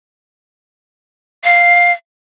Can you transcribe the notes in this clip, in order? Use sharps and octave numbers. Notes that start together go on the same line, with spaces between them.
F5